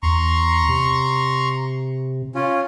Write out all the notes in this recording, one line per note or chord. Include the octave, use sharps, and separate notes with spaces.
E2 A#5 C6 C#6
C3
C#4 F4